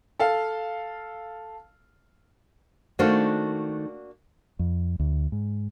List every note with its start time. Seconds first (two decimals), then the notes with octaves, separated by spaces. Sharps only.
0.20 A4 F5
2.99 D#3 A3 A#3 D4 F#4 C5
4.59 F2
5.00 D2
5.32 G#2